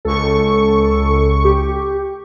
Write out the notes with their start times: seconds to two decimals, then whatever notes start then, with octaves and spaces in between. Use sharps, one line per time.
0.05 C#2 A4 C#6
1.45 G4